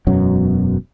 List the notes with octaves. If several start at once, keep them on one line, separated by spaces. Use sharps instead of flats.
E1 F#2 B2 F#3